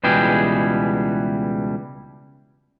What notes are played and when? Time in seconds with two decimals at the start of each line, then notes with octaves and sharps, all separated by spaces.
0.04 C#2 B2 E3 G3 G#4 G5